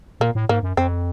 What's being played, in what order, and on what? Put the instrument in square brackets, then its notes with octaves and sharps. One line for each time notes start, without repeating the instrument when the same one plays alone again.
[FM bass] A#2 [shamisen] A#3
[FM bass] A2
[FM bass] G#2 [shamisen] A#3
[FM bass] F#2
[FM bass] F2 [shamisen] C4